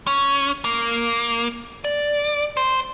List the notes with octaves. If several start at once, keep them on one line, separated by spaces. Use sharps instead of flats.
C#4
A#3
D5
C5